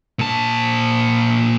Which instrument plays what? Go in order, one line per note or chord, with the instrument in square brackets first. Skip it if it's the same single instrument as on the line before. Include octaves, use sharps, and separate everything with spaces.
[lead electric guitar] A#2 A5